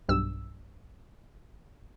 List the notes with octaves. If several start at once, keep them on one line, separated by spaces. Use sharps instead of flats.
B1 G2 E6